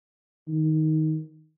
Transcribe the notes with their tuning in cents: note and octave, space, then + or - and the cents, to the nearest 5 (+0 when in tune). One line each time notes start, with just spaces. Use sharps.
D#3 +10